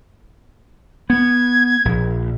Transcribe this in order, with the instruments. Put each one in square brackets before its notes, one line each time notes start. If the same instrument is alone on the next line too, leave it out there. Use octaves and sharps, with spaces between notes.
[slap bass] B3 [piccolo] G#6
[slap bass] A#1